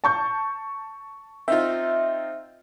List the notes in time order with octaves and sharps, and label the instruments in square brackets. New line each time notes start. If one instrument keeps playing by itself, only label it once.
[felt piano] A5 C#6 G6
[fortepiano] C4 D#4 F4 [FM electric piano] E5